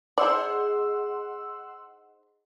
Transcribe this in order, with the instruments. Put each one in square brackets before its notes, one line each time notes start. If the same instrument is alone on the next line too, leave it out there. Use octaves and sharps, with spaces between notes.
[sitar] D#4 G#4 C5 [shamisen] D5 [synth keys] F#5 C6 E6